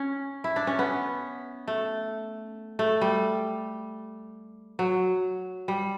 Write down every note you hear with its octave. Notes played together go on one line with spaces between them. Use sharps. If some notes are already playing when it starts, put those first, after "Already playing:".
Already playing: C#4
E4
D4
C#4
B3
A3
A3
G3
F#3
G3